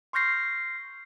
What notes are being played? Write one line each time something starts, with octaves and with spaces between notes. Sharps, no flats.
C6 C#6 F6 G6 A#6 C7